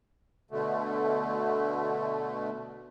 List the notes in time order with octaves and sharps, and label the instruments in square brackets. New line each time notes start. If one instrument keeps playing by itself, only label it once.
[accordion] B2 D3 A3